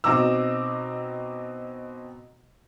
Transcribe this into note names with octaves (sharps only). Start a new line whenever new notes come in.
B2 C4 D#4 A#5 D6 E6